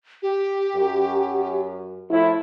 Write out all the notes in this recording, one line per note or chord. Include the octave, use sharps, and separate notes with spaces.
G4
F#2
A2 F3 E4